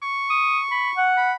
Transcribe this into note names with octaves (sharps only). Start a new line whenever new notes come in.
C#6
D#6
B5
F#5
B5